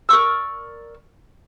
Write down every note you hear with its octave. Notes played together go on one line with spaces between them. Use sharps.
A#4 D5 C#6 E6